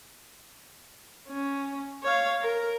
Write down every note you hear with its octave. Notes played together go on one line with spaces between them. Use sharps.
C#4
C#5 F5
A#4